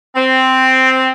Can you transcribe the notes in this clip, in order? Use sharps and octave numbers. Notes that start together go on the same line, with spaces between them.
C4